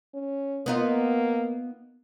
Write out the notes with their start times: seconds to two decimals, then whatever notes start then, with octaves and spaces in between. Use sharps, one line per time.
0.14 C#4
0.66 A#3 B3 D#4 F4